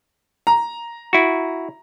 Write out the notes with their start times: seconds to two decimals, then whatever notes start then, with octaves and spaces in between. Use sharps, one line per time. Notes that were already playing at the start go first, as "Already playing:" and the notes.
0.47 A#5
1.13 E4 F#4